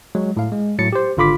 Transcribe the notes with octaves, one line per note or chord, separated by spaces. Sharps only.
F#3 G#3
A2 F5
G#3
A2 F#3 A6 C#7
G4 C5
G#1 D3 F4 B5 D6 B6